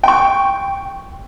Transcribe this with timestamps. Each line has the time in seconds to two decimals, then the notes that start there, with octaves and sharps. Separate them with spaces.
0.03 G5 C#6